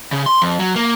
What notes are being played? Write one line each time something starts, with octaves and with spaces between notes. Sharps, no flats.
C#3
C6
F2
F#3
A#3